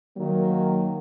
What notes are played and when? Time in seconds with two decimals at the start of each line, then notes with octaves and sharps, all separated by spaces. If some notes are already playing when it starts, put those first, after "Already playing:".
0.16 D#3 F#3 A#3